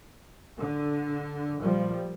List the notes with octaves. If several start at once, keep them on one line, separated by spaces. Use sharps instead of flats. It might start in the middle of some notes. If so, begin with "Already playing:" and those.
D3
A#2 F3 G3